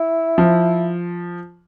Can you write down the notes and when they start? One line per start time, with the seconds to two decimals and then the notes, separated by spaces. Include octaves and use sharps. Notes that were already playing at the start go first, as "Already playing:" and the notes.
Already playing: E4
0.38 F3